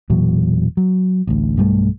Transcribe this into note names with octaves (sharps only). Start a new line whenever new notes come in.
E1 A#2 E3 F#3
F#3
A1 D2
B1 G2 G3 A3